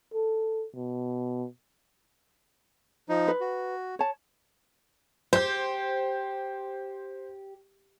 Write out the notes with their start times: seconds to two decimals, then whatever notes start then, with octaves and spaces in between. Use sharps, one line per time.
0.14 A4
0.75 B2
3.09 F3 D#4
3.28 B4
3.40 F#4
3.99 C#5 A5
5.33 G4 C5 G6